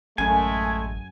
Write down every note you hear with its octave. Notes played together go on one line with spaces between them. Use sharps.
A1 F#2 G#3 A3 G#5